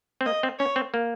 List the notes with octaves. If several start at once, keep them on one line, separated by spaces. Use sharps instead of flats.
C4
A#3 D#5
C4
C#4 C#5
C4
A#3